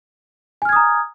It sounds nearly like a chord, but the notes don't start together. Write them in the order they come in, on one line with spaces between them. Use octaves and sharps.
G#5 F6 G#6 D#6 A#5